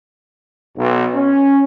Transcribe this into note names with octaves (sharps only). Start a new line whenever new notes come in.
B1
C#4